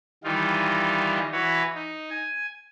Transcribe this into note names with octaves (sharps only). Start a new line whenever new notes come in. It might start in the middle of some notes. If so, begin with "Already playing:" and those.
D#3 E3 G3 D#4 F4
E3 F#4 B4 C#5
D#4
G#5